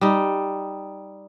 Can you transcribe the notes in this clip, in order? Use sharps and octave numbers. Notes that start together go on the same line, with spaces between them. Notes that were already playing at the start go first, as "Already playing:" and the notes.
G3 D#4